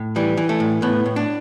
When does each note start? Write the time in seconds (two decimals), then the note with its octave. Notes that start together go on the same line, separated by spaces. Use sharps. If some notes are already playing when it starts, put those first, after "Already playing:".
Already playing: A2
0.16 E3 G3
0.37 E3
0.49 A3
0.60 A2
0.82 A2 B3
1.06 A2
1.16 D4